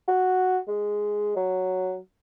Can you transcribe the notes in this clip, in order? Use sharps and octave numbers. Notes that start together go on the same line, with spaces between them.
F#4
G#3
F#3